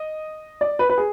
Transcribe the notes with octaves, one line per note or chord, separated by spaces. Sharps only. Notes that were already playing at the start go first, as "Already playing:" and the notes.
Already playing: D#5
D5
B4
B4
G#4